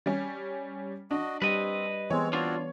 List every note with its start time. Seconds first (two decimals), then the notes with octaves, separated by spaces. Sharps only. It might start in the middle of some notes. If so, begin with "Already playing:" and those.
0.06 G3 C#4
1.11 D4 F#4 D#5
1.42 G3 C4 B4 D#5
2.10 E3 G#3 B3 C4 C#5
2.33 C4 D4 F4 F#4